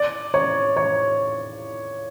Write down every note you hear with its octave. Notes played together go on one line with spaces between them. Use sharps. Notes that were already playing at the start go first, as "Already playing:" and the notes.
Already playing: D5
C#5
C#5